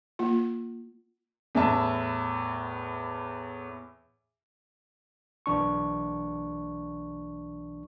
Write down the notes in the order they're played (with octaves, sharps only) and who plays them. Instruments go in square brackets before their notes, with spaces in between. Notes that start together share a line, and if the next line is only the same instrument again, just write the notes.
[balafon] A#3 F4
[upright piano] E2 A2 E5 A5
[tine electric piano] B1 E3 D4 C#6